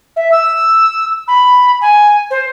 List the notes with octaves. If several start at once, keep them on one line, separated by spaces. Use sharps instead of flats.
E5
E6
B5
G#5
C5